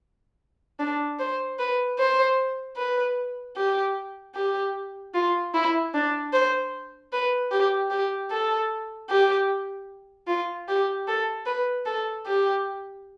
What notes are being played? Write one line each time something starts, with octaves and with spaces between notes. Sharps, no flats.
D4
C5
B4
C5
B4
G4
G4
F4
E4
D4
C5
B4
G4
G4
A4
G4
F4
G4
A4
B4
A4
G4